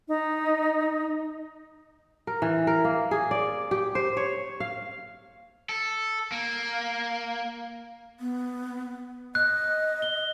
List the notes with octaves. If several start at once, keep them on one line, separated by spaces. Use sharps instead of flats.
D#4
A#4
E3
A#4
A#3
G#4
D5
G4
C5
C#5
F5
A4
A#3
B3
D#5 F#6
G7